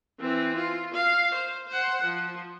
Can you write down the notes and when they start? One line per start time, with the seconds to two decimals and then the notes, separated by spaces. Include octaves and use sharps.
0.20 E3 C4
0.56 F4
0.94 F5
1.34 C5
1.68 C5 F#5
2.04 F3